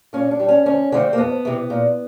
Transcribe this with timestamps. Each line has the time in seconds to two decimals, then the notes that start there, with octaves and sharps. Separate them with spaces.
0.13 A#2 C#4
0.31 D4
0.39 G3
0.48 C#4
0.66 D2 C#4
0.92 D3 F3 A3 C4
1.13 A#3
1.18 F2 B3
1.45 C3 E3
1.70 A#2